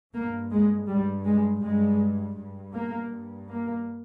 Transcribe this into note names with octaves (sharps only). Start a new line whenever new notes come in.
G2 A#3
G#3
G2 G3
G#3
G2 G#3
G2
A#3
G2
A#3